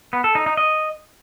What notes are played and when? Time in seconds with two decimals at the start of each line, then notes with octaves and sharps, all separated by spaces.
0.13 B3
0.24 A4
0.35 D#4
0.46 D#4
0.57 D#5